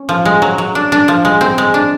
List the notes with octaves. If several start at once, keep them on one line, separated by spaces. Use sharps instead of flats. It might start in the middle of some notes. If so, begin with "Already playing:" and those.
Already playing: C#4
F3
G#3
F#3
F#3
D4
D4
F3
G#3
C4
G#3
D4